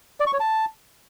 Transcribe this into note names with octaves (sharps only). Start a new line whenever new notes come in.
D5
C#6
C#5
A5